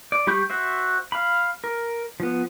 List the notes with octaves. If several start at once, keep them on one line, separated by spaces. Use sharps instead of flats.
D5
G3 G4 B5 C#6 G6
F#4 C5 E5
F5 B5
A#4
F3 B3